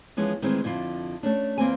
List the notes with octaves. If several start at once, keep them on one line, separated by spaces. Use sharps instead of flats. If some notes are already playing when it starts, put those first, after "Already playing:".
E3 F3 G#3 B3 C#4
D#3 E3 G#3 A3 C4
F2 D3 E4 F4
A3 C#4 D4
E2 A#3 C4 G#5